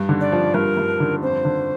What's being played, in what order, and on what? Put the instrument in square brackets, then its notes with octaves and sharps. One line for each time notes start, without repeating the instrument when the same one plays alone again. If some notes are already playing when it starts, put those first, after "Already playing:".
Already playing: [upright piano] G2
D3
[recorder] D5
[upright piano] F3
[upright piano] G2 [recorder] A#4
[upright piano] G2
D3
[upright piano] F2 [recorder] C5
[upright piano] D3